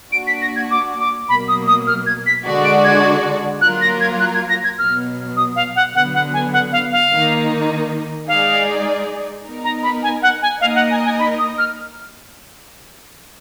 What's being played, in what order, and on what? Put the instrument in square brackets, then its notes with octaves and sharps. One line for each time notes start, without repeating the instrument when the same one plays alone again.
[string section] A#3 D4 F#4 [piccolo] D7
[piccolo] B6
A#6
G#6
D6
D6
[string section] B2 F#3 A#3 [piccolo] B5
[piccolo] D#6
D#6
F6
G#6
B6
[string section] D3 G#3 D4 F#4 D5
[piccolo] D7
G#6
[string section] F#3 A#3 F4 A#4 [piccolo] F#6
[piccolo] A#6
G#6
F#6
G#6
A#6
G#6
[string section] B2 F#3 B3 [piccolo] F6
[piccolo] D#6
F5
F#5
[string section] D3 F#3 B3 [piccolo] F#5
[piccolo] F#5
G#5
F#5
F5
F5
[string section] D#3 A#3 D#4
[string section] G#3 D#4 G#4 D5 [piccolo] F5
[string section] B3 D#4 A#4
[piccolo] A#5
B5
G#5
F#5
G#5
[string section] A#3 D#4 A#4 D#5 [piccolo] F5
[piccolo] F#5
G#5
G#5
B5
D#6
F6